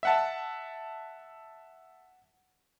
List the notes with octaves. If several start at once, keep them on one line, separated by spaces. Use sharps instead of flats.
E5 F#5 A5